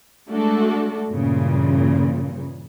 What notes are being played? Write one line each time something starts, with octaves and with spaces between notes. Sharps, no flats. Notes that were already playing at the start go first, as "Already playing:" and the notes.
G#3 A3 D4 F#4 A4
G2 A#2 C#3 E3